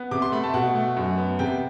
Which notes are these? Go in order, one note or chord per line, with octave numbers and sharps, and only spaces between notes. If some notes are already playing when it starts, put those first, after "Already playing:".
Already playing: B3
C3 D6
C6
A3 B5
A5
B2 F#5
A3
F#2
B3
C3 G5